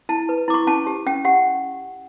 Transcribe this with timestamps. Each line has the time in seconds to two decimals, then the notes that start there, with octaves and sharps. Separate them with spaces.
0.09 E4 A5
0.29 B4
0.48 E4 D6
0.54 C#6
0.67 C#4 A5
0.87 G4
1.06 C#4 G5
1.25 G4 F#5